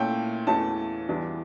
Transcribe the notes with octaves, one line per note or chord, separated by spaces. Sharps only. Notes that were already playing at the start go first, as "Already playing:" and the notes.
Already playing: A#2 A3 C#4 E4 G5
E2 E3 A3 C#4 A5
E2 E3 G3 D4